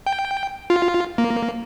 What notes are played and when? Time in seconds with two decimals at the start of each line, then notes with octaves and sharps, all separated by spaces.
0.06 G5
0.70 F4
1.18 A#3